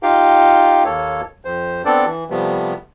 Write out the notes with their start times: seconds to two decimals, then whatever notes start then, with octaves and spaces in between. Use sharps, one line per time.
0.03 D#4 F4 G4 F5 G5
0.85 D#2 A#3 A4 C#5
1.45 F2 C5
1.85 B3 C4 D4 A4 D5
2.06 E3
2.30 C3 F3 G3 A3 B3